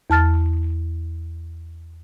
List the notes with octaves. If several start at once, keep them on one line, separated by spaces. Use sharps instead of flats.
E2 A5 F6 A6